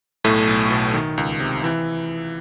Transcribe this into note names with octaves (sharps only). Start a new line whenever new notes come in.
B1 A2 A3
B1
B2
D#3
C#2
C3
E3